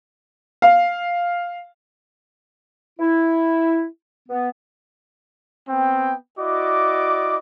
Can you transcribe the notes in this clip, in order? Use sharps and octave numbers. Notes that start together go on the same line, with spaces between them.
F5
E4
B3
B3 C4 G5
E4 F#4 D5 D#5 D6